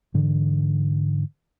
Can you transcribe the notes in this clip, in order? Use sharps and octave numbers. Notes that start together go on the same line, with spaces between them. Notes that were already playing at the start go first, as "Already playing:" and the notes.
G#2 D3 E3